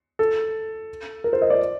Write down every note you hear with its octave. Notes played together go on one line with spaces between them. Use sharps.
A4
A#4
C5
D#5
D5